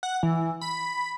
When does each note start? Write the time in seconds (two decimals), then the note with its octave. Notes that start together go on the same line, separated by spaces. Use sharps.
0.03 F#5
0.23 E3
0.61 B5